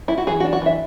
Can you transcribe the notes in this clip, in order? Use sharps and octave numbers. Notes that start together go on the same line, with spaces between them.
E4
F#4
E3 G#4
F#4
D4
F#4
E3 E5